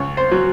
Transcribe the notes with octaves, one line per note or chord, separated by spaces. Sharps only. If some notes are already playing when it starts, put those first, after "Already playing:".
Already playing: C#2 C#5
C5
F#3